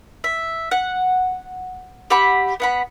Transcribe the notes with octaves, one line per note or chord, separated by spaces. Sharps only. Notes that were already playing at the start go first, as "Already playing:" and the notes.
E5
F#5
G4 E5 F#5 B5
B3 F#5 B5